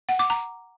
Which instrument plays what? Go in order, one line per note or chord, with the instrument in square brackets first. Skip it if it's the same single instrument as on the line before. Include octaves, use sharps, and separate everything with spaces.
[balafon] F#5
D6
A#5